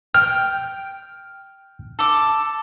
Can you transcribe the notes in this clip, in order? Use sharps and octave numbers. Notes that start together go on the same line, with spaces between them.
G5 F6
A4 D6